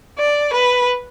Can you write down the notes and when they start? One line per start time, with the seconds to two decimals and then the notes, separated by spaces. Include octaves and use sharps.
0.18 D5
0.53 B4